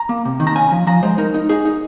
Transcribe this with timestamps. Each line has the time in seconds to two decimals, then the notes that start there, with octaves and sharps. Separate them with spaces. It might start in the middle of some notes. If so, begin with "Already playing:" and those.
Already playing: A#5
0.09 A#3
0.25 C3
0.40 D#3
0.47 A#5
0.56 C#4 G#5
0.71 F3
0.87 F3 A#5
1.03 G#3 C5
1.18 D#4 A#4
1.34 D#4
1.49 D#4 G#4
1.65 D#4